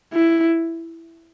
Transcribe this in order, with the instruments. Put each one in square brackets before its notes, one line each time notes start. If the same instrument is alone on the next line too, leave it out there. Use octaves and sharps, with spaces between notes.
[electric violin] E4